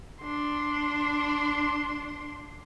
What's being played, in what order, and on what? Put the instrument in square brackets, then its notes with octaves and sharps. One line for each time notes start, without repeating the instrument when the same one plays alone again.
[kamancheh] D4 C6